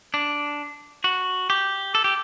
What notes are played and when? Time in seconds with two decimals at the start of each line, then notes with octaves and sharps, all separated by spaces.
0.14 D4
1.04 F#4
1.50 G4
1.95 A4
2.04 G4